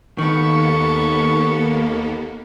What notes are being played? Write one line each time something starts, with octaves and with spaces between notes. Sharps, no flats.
D#2 D#3 A#3 B3 A4 C#6